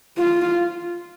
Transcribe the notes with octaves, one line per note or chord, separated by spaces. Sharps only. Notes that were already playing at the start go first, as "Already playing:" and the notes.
F4